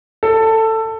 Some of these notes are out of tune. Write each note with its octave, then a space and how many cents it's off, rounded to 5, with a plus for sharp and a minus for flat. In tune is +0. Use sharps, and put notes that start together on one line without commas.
A4 +15